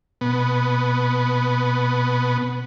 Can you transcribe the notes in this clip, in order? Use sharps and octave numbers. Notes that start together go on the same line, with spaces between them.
B2 B3